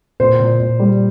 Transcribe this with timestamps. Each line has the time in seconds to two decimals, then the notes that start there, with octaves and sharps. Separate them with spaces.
0.20 A#2 C5
0.40 A#2
0.59 A#2
0.79 G3